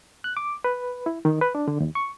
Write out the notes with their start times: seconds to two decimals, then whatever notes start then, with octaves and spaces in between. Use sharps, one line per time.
0.24 F#6
0.37 D6
0.64 B4
1.06 E4
1.25 D#3
1.41 B4
1.55 D4
1.68 D3
1.80 D#2
1.95 C#6